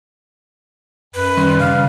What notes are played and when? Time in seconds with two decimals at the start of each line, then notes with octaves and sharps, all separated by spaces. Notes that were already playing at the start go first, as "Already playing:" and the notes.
1.15 F#2 B4
1.37 D#3 G3 C#4 C6
1.60 C#3 F5